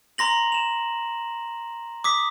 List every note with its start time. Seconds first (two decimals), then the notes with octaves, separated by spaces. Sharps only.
0.18 A#5 C6 A#6 F#7
0.52 E7 F7
2.04 D6 D#6 B6